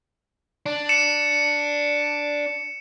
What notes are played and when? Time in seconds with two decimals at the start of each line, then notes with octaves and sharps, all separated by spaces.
0.66 D4
0.89 C#7 E7